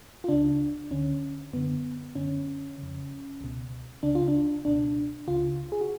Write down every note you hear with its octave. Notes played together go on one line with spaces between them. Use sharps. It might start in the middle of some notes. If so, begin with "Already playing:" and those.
F4
C#2 C#3 D4
D2 D3 C#4
F#2 D3 B3
F#2 D3 C#4
F2 C#3
C#2 B2
C#2 C#3 D4
F4
D4
C#2 B2 D4
C#2 C#3 F4
G#4
F#4